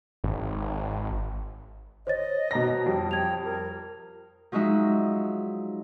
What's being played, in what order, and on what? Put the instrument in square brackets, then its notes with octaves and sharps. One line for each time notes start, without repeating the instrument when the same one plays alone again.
[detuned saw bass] G#1
[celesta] C5 C#5 A6 [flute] D#5
[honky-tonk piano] B2 A#5 A#6
[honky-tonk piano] F2 G3 [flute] G5
[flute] G5 [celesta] G#6 F7
[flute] A#4
[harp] F3 F#3 G#3 D#4 E5